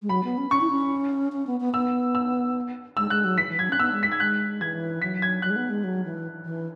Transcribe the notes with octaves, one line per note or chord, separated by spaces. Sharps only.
G#3
F#3 B5
B3
C#4
C#4 C#6
E4
C#4
C#4
B3
B3
B3 E6
E6
G#3 E6
G#3 F#6
F#3
E3 B6
E3
F#3 G#6
C#4 F#6
B3 E6
G#3
B6
G#6
G#3 F#6
E3 G#6
F#3 B6
G#6
F#3 F#6
G#3
B3
G#3
F#3
E3
E3